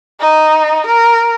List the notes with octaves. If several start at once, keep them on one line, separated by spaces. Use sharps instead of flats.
D#4
A#4